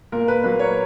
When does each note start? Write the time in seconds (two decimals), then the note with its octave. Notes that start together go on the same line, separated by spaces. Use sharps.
0.12 A#2 A#4
0.28 B4
0.43 F#3 A#3 B4
0.59 C#5